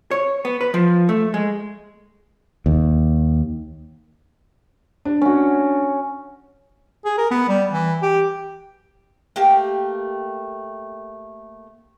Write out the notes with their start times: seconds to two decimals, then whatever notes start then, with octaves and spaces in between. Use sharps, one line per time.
0.11 C#5
0.45 B3
0.61 B4
0.74 F3
1.09 A3
1.34 G#3
2.66 D#2
5.05 D4
5.22 C#4 F#4
7.05 G#4
7.18 A#4
7.31 B3
7.49 G3
7.72 E3
8.02 G4
9.36 A3 A#3 G4 G5